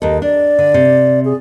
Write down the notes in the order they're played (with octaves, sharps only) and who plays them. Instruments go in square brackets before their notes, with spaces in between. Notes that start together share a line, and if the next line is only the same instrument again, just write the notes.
[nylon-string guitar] D#2 A4 [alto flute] D#5
[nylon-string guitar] D4 [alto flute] D5
[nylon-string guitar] D3
C3
[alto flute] G#4